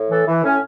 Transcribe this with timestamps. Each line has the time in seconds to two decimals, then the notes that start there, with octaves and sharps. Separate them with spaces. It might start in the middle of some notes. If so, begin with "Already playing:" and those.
Already playing: A2
0.10 E3 A4
0.27 E3
0.44 A2 C#4